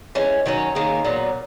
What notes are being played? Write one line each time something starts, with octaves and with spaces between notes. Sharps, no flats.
E3 G#3 C#4
D#3 F#3 C#4
D#3 A#3 C#4 G#4
A#2 F#3 B3